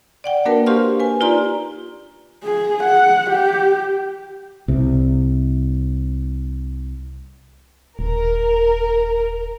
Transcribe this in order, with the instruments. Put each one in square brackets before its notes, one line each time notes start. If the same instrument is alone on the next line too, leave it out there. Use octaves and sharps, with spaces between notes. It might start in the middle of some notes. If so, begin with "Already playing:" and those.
[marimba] D5 F#5 G5
A#3 D4 F#4 A#4 B4 A5
G4 C5 F5 C6 C#6 F6
B4 G#5
D#4 F4 G4 D5 A#5 C6
[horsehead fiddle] G#4
F#5
G4
[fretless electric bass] C2 C3
[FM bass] D#1 [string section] A#4